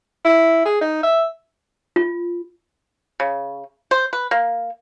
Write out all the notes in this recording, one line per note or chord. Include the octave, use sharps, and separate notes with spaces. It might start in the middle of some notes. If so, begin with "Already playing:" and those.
E4
G#4
D#4
E5
F4
C#3
C5
B4
A#3